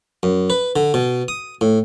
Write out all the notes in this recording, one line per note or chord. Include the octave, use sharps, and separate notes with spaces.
F#2
B4
D3
B2
D#6
A2